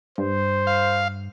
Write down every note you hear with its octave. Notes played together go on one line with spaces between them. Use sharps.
G2 C5
F5